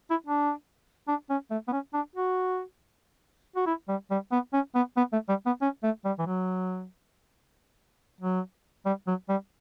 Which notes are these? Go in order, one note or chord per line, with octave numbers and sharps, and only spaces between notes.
E4
D4
D4
C#4
A3
B3
C#4
D4
F#4
F#4
E4
G3
G3
B3
C#4
B3
B3
A3
G3
B3
C#4
A3
G3
E3
F#3
F#3
G3
F#3
G3